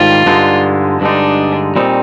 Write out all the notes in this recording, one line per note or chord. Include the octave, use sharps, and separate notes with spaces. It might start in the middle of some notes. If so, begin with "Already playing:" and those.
Already playing: G#2 D#3 G3 D4 F4
G2 D3 G#3 D#4
G2 D3 G#3 D4 D#4
A#2 G3 C4 D#4